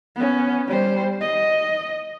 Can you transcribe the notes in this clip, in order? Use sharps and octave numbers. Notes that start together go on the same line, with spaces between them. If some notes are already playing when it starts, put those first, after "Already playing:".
B3 C#4
G3 C5
D#5